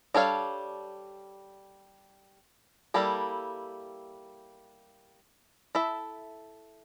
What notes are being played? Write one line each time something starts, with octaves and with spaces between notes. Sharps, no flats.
G3 D4 A4 C#5 F5
G3 A#3 E4 A4
E4 A4 E5